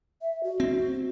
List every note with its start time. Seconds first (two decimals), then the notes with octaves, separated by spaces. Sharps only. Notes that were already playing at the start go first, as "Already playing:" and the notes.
0.22 E5
0.44 F#4
0.60 C4